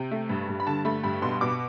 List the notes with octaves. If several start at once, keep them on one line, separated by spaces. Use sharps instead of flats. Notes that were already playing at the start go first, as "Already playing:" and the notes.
Already playing: C3 G5
A3
G2
G2
B5
D3 A5
A3 B5
G2 B5
B2 C6
B2 D6